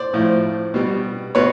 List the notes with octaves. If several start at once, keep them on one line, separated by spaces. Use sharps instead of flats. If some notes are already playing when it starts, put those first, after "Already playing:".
Already playing: C5 D5
A2 F3
B2 G3
B2 B4 C#5